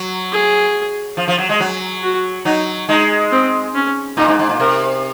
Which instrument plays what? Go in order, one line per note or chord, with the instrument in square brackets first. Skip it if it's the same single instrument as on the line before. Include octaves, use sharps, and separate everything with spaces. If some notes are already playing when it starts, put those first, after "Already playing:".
Already playing: [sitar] F#3
[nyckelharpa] G#4
[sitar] F3
F3
F#3
G#3
F#3
[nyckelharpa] F#4
[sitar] F#3 [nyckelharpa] D#4
[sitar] G#3 [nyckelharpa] D#4
[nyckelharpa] C4
C#4
[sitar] A#2 [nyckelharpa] D#4
[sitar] G#2
G#2
A#2
[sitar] C3 [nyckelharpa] A#4